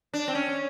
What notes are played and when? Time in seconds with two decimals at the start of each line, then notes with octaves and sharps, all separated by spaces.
0.14 D4
0.28 C4
0.35 C#4